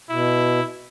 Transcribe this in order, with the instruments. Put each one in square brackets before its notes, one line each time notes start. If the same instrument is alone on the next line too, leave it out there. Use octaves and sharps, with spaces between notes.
[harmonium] B2 [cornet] E4